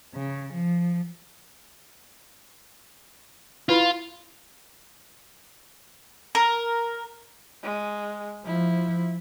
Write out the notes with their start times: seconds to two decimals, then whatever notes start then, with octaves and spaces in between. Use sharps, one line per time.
0.14 C#3
0.53 F3
3.69 E4 F4 B4 B5
6.35 A#4
7.63 G#3
8.46 F3 E4